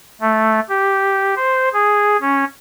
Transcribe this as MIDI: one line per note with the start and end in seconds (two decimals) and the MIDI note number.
0.21 0.60 57
0.69 1.34 67
1.36 1.69 72
1.73 2.17 68
2.21 2.44 61